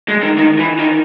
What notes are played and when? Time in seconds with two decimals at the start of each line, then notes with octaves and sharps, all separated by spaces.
0.08 G#3
0.23 D#3
0.38 D#3
0.59 E3
0.79 D#3